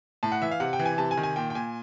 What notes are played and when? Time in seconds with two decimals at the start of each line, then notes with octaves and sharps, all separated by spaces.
0.23 A2 A5
0.32 F#5
0.41 E3 E5
0.51 F5
0.60 C3 F#5
0.73 G5
0.79 E3
0.86 G#5
0.98 C3 A5
1.11 G#5
1.17 D#3
1.23 G#5
1.36 A#2 G5
1.50 G5
1.55 A#2 G#5